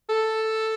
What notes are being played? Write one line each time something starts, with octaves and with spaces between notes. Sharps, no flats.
A4